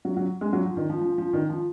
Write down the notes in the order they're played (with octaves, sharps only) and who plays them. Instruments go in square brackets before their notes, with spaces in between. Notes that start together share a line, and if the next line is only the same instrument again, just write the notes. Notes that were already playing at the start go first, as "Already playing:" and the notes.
[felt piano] F#3
F#3
G#3
F#3
F3
D#3
F3
F3
F3
D#3
F3